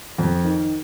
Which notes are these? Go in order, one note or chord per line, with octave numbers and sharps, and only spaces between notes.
F2
D#3